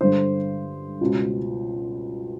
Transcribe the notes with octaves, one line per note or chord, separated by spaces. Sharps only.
G2 D3 C5
C#2 B2